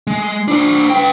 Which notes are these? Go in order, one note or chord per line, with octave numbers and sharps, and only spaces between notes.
G#3
D4 C5
B4 G5